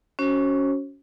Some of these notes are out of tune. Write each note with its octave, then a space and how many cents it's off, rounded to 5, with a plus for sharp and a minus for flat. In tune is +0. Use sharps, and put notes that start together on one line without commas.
C#4 +15 F#4 +15 C5 +45